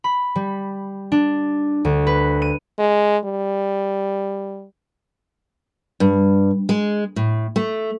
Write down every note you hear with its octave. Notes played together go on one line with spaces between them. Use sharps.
B5
G3
D4
D2
B4
D#7
G#3
G3
G2
G#3
A2
A3